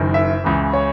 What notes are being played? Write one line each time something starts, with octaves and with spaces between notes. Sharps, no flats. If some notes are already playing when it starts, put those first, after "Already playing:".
Already playing: F#1 F#2 D#3
E5
C#2 C#3 E3
C#5